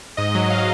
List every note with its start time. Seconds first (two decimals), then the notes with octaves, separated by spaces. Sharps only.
0.17 G#2 D#5
0.35 F#3
0.50 F5